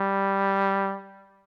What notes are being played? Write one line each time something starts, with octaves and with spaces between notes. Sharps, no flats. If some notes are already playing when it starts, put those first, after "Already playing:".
Already playing: G3